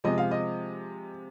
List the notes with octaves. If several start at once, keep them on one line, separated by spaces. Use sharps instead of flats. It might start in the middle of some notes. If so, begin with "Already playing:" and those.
C3 F3 G#3 D#5
F5
D#5